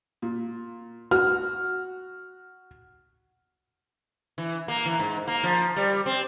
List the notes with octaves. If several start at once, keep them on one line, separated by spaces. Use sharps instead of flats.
A#2
F#4 F6
E3
A#3
E3
G#2
A#3
F3
G3
C4